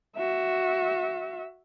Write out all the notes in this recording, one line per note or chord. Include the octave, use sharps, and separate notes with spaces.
F#4 E5